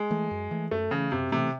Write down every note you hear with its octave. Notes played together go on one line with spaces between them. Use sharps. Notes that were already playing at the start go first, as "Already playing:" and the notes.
Already playing: G#3
E3 A3
F#2
E3 A3
F#2 A3
C#3 E3 A3
F#2 C3
C3 E3 A3